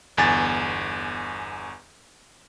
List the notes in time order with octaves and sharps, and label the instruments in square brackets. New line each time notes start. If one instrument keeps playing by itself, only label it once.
[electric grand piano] G1 E2 G#5 A6